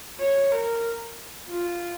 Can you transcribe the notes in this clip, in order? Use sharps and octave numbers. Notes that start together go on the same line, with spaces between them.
C#5
A#4
F4